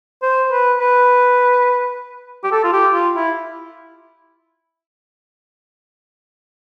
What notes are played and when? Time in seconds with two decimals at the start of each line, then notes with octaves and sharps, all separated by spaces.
0.22 C5
0.51 B4
0.79 B4
2.44 G4
2.52 A4
2.64 F4
2.72 G4
2.94 F4
3.16 E4